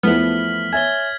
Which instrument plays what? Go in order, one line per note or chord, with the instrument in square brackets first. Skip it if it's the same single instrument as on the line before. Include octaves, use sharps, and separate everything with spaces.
[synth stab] E2 B3 [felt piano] F3 A3 E4 [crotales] F6 B6 F#7
[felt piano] C#5 E5 G#5 [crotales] G#6 A6 G7